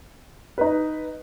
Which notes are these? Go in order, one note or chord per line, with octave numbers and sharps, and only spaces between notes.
D#4 B4